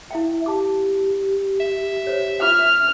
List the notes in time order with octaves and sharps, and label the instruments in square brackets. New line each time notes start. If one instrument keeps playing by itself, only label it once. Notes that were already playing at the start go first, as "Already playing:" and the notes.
[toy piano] E4 F5 G5 [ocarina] E5
[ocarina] G4 [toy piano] F5 A5 D6
[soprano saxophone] E5
[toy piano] C5 C#5
[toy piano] F4 C#6 D6 [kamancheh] F6